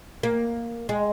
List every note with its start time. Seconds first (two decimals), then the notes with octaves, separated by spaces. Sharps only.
0.23 A#3
0.89 G#3